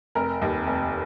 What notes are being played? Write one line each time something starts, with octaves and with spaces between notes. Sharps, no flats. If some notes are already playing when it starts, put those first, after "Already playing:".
F1 A#4
D#2
F1